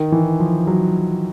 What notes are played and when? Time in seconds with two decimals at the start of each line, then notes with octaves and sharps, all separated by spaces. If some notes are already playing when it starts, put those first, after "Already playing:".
Already playing: D#3
0.12 E3
0.40 F3
0.67 F#3